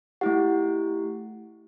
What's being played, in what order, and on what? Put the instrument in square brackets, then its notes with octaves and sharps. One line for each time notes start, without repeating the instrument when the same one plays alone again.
[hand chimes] A3 E4 G4 F#5